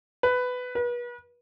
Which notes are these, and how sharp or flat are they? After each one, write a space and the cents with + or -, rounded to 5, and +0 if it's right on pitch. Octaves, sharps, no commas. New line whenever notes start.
B4 +15
B4 -35